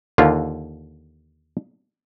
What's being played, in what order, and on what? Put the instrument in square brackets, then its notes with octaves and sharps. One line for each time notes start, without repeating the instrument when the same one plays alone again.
[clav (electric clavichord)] D#2 D3 F4